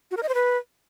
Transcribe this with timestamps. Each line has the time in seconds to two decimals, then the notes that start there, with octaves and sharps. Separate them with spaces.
0.11 F#4
0.17 A#4
0.23 D#5
0.29 C5
0.35 B4